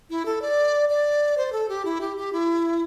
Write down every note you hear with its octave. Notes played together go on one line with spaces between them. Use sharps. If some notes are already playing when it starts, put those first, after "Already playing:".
E4
A4
D5
D5
C5
A4
G4
E4
G4
G4
E4